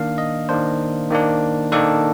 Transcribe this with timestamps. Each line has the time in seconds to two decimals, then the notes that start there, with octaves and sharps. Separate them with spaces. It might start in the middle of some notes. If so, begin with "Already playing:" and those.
Already playing: D#3 A#3 D4 F5
0.18 D#5
0.49 D#3 A#3 D4 C5
1.11 D#3 A#3 D4
1.72 D#3 A#3 D4 A4